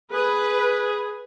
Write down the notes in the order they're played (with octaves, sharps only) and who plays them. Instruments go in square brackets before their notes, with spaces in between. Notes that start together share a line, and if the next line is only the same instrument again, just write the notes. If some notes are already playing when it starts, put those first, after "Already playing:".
[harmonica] G#4 [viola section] B4